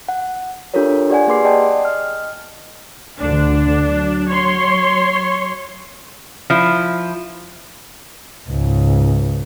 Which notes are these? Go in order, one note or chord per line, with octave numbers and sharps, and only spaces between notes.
F#5
D4 F4 G4 A4 A#4 C#5
G4 D5 F#5 G#5
A#3 G#4 B4 C6 D6 C7
D5 D#5 F#5 G5 A5
D#5 F6
D2 D3 D4
F#3
C#5 C6
F3 E4
C#2 G#2